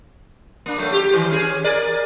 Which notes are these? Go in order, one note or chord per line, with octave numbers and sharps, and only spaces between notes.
A#3 D4
F#3 A3
G4
D#3 E3 G3
C#4 G#4
G#4 A#4 D5